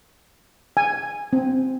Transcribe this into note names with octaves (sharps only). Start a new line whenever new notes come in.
G#5
C4